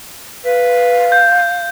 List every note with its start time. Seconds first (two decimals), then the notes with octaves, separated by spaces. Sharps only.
0.45 B4 F5
1.12 G6